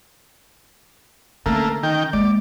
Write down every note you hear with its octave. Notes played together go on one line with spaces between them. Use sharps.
D3 A3 A#3 C#4
D#3 G5
G#3 A#3 D5